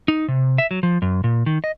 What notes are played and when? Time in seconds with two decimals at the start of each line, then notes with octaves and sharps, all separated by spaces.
0.08 D#4
0.28 C3
0.58 E5
0.71 F#3
0.83 F3
1.02 F#2
1.24 A#2
1.46 D#3
1.64 D#5